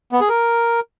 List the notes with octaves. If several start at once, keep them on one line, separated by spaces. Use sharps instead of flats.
B3
G#4
A#4